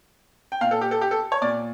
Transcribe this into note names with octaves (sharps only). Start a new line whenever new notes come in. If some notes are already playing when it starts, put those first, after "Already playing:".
G5
A#2 F5
A4
G4
A4
G4
A4
C#5
A#2 D5